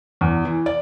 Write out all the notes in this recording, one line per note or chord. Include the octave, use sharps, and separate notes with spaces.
E2
E3
D5